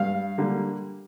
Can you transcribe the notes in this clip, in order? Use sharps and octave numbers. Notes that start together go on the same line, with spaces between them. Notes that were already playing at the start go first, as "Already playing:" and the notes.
Already playing: G2 F5
D3 G3 A#3